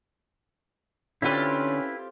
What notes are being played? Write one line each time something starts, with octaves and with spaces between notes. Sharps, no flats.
D3 C4 C#4 E4 F4 G4 B4